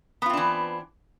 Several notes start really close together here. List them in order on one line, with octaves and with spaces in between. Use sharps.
B3 F4 C4 D4 E3